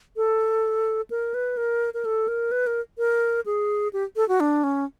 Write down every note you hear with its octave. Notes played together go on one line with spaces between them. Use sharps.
A4
A#4
B4
A#4
A#4
A4
A#4
B4
A#4
A#4
G#4
G4
A4
F#4
D4
C#4